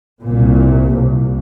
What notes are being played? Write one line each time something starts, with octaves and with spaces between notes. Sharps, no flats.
C2 A#2
C2 A#2